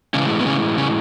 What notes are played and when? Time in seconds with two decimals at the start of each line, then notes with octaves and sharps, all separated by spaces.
0.14 A2 C#3 E3 G#3 C#4
0.40 B3
0.46 C#3 C#4
0.78 C#3 C#4